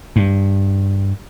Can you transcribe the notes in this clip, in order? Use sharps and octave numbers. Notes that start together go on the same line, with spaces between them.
G2